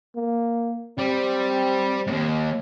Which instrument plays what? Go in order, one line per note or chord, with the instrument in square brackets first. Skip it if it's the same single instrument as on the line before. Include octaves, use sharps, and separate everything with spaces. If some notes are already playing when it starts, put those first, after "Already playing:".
[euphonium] A#3
[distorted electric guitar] G3 [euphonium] C4
[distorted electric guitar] D#2 G#2